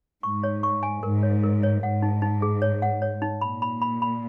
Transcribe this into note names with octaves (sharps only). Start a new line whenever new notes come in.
G#2 C#6
C#5
C#6
G#5
G#2 A#4
C#5
A#4
C#5
G#2 F#5
D#4
D#4
G#4
C#5
F#5
C#5
D#4
A#2 B5
B5
B5
B5